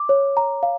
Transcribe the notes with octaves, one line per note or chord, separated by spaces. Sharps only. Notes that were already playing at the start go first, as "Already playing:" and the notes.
Already playing: D6
C#5
A#5
F5